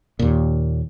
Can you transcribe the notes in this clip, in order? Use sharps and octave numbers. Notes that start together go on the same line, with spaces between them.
D#2 A#2